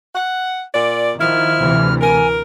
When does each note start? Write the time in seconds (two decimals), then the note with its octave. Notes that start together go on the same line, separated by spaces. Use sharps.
0.15 F#5
0.74 A#2 D5
1.20 D#3 F3 E4 F6
1.58 D2 C3 E3
2.01 A#4 G#5